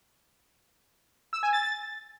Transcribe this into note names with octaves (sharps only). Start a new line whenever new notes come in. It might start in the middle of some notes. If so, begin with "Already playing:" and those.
E6
G#5
A6
A6